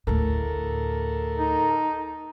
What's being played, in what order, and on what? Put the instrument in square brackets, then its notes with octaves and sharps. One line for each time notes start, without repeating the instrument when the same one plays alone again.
[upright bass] D2 A2 [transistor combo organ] A4 A#4
[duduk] D#4